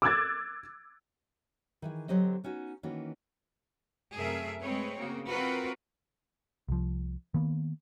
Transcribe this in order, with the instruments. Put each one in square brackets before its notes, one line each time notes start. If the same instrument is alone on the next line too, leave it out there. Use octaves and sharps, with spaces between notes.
[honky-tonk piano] D6 E6 F#6 G#6 A6
[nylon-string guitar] D#3 E3 G#4
D3 F#3 C4 G4 C5 D#5
B3 C#4 D#4 F#4
D#3 E3 A#3 C#4 F#4
[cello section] F#2 C3 A3 G#4 A#4 E5
G#3 A3 C4 B4 C#5
C#3 A#3 F#4
C4 F4 F#4 A#4 B4
[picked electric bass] C2 F3
D#3 A#3 B3